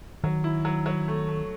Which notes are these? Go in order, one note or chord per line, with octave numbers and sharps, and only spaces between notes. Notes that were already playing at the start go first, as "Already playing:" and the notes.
D#3 F#3
E4
F#3
F#3
A3
A3